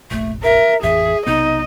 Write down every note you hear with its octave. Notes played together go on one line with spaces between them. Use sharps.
F1 A#1 A3
A#4 E5
A1 F2 E3 G#4 E5
B1 C3 B3 D#4 D#5